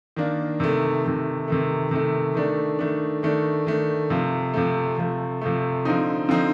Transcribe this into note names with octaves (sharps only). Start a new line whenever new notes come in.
D#3 A#3 D4
C3 D#3 A3
C3 D#3 A3
C3 D#3 A3
C3 D#3 A3
D#3 A3 D4
D#3 A3 D4
D#3 A3 D4
D#3 A3 D4
C3 F3 A3
C3 F3 A3
C3 F3 A3
C3 F3 A3
D3 F3 C4 D#4
D3 F3 C4 D#4